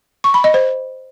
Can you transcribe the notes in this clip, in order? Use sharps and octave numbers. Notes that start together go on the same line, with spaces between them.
C#6
B5
D#5
C5